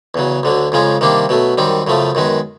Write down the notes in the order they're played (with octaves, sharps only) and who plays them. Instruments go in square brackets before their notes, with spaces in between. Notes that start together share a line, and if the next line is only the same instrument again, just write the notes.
[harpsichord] E2 C#3 F#3
D2 D3 F#3
F2 C#3 F3 G#3 C#4
C3 D#3 G3 A#3 D4
B2 F#3 A3
F#2 D#3 G3 C4
F#2 C#3 F3 A3
F#2 D#3 G#3 B3